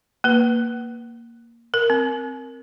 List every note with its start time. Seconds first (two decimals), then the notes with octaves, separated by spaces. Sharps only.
0.24 A#3 B4
1.74 A#4
1.90 C4